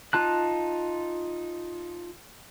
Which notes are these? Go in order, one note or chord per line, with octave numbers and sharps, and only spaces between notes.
D#4 F4 A5 F#6